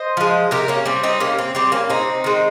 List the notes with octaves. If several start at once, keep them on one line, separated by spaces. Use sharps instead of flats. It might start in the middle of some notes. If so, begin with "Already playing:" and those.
Already playing: C5 D#5
F3 G#3
C3 G4 A#4
A#3 C#4
G3 C4
C4 D#4
C3 A#3 C#4
C4
G3 C4
A#3 C#4
C3 C4 D#4
D#3 G#3